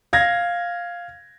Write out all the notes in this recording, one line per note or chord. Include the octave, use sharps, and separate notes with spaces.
F5 G#6 A#6